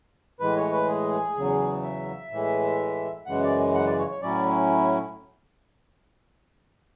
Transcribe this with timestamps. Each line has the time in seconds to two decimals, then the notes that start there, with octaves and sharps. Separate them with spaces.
0.40 A2 E3 G#3 B4
0.56 C#5
0.73 B4
0.88 G#4
1.37 E2 C#3 F#3
1.83 E5
2.31 A2 E3 G#3
3.26 F#2 C#3 E3 G#3 F#5
3.43 D5
3.74 F#5
3.87 D5
3.99 C#5
4.10 C#5
4.22 A2 F#3 C#4 E4 D5